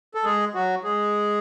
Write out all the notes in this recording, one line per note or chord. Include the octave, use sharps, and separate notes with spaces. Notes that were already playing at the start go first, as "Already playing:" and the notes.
A4
G#3 G#4
F#3 F#4
G#3 G#4